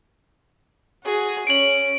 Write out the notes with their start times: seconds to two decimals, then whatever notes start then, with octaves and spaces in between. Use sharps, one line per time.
1.04 F#4 G#4
1.47 C#4 D7 F#7